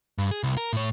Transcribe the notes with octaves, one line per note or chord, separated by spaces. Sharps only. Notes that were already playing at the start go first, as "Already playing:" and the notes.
G2
G#4
C2
A#4
A2 C#5